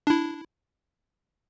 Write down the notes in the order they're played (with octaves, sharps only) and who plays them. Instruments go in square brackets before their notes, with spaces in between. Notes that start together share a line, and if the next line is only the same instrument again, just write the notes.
[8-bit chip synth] D4 E4